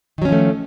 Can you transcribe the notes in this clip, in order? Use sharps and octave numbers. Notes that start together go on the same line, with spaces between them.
D#3 F3 F#3 A3 C#4